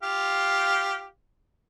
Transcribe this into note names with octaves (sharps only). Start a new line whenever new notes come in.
F4 G4 F5